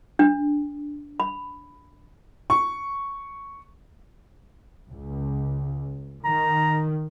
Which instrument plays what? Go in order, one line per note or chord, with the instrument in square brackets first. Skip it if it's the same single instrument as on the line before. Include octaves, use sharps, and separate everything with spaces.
[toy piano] D4
B5
[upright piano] C#6
[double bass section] C#2
[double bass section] D#3 [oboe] A#5